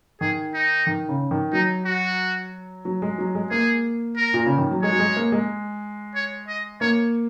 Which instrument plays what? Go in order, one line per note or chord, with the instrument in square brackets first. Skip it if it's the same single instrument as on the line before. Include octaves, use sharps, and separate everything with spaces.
[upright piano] D#3 [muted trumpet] G#4
[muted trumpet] D#4
[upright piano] D#3
C#3
D#3
[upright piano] F#3 [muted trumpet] D#4
[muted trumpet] F#4
[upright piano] F#3
G#3
F#3
G#3
[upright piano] A#3 [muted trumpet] G#4
[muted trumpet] A#4
[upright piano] A#2
C#3
D#3
F#3
[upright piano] G#3 [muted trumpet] C#5
[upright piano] F#3
G#3
A#3
G#3
[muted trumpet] C#5
D#5
[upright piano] A#3 [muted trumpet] C#5